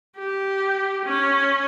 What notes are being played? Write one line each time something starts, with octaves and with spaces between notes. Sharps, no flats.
G4
C#4